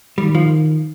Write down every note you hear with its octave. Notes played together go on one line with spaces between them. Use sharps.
D#3 G3
F3